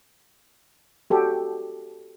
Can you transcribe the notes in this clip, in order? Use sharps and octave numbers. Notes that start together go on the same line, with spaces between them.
F#4 G4 A4